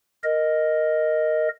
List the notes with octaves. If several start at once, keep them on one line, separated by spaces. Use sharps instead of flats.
A#4 D#5